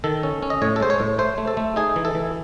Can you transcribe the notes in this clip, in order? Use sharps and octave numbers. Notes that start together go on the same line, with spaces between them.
D#3 A4
C#4
C#4
D#5
A2 C#5
A4
G#3 C5
C#5
A2
A3 C5
A3
A4
A3
D#4 G#4
E3
A4
E3